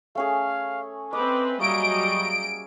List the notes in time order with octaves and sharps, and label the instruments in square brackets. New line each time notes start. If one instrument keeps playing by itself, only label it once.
[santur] A3 C#4 G#4 [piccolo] F5
[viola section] C4 B4 [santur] D#5 [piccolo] D6
[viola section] F#3 G3 D#5 [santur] A#3 E5 G#5 [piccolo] C#6 [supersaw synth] D7